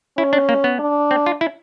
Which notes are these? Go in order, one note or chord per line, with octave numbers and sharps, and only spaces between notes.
C#4 E4
D4
A#3
B3
D4
C4
F4
E4